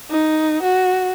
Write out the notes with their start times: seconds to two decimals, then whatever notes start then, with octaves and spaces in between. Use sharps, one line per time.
0.10 D#4
0.63 F#4